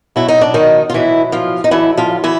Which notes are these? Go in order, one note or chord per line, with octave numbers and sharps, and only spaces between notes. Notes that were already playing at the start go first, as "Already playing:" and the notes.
B2 F#3 E4
D#4
D4
D#3 D#4
F4
B2 E3 F#3 E4
F3 F4
D#4
D3 E3 F#3 E4
F3 F4
E3 E4